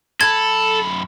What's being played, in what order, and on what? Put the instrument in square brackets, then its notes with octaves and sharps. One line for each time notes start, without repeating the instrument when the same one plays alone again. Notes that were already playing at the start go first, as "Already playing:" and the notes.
[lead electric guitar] F#2 B5 [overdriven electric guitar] A4 [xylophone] G#6